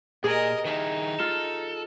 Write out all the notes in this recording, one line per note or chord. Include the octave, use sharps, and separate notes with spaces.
A#2 G#4 A#4 D#5
D#3 D#4 E4
F4 A4